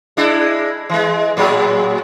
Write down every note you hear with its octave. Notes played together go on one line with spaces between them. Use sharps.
G#3 D4 E4
E3 G#3
A2 F#3 G#4